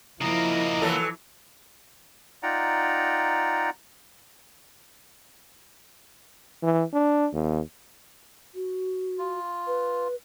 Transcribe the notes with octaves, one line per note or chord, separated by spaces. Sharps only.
C#3 F3 A#3 E4 D#5 A#5
E3 F#3 A4
D#4 F4 D5 F#5 G5 A#5
E3
D4
D#2
F#4
F4
B4